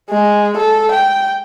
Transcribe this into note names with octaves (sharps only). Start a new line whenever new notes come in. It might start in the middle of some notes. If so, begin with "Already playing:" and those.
G#3
A4
G5